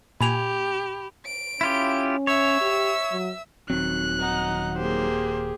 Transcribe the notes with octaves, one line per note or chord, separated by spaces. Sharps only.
A#2 G4 G#5 B5 F7
D7
C#4 E4 F4 G4
C#5 E5 E6
G4
F#3
D#1 D#3 F#3 C4 F#6
D#4 F#5
A#3 G4 G#4 C5